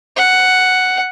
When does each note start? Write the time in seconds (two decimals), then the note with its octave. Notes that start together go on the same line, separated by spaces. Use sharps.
0.17 F#5